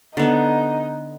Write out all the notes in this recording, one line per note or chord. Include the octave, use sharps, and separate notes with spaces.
D3 B3 D#4